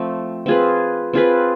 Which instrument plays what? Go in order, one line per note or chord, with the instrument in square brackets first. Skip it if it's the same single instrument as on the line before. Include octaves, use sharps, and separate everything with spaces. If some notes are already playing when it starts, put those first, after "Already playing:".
Already playing: [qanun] F3 A3 C4
C4 F4 G#4 B4
C4 F4 G#4 B4